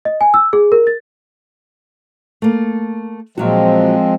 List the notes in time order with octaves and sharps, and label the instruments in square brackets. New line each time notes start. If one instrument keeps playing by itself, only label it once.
[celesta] D#5
G#5
E6
G#4
A#4
A6
[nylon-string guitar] A3 A#3
[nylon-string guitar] A#2 F#3 F#4 [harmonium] F3 G#3 C4